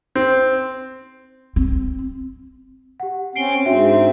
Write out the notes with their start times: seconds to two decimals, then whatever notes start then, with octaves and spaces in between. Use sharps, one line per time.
0.15 C4
1.56 C4
3.00 G4 F#5
3.35 C4 C#4 C7 D7 G7
3.66 G#2 C4 D4 F#4 E5